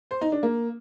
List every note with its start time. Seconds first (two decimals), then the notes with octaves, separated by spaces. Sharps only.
0.11 C5
0.21 D#4
0.32 D4
0.43 A#3